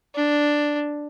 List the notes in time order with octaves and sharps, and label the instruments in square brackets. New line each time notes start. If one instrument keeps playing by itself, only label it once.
[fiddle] D4